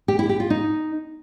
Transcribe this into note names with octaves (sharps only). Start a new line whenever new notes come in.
G4
E4
G4
F4
D#4